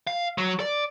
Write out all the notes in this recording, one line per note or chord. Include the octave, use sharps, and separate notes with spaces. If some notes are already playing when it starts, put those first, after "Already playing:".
F5
F#3
D5